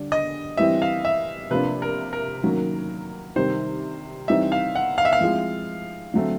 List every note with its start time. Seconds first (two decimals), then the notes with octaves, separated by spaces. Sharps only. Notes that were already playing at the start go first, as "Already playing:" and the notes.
Already playing: D3 G3 D4
0.12 D#5
0.57 E3 G3 C4 E4 E5
0.82 F5
1.05 E5
1.50 C3 F3 A#3 D4 F4 B4
1.82 A#4
2.13 A#4
2.43 D#3 F#3 A#3 C#4
3.36 C3 D#3 G3 C5
4.28 E3 G3 C4 D#4 E5
4.52 F5
4.75 F#5
4.98 F5
5.05 E5
5.13 F5
5.21 F3 G#3 C4 E4
6.14 D3 F#3 A3 C4